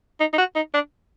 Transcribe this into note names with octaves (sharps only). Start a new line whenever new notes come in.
D#4
D#4
F#4
D#4
D4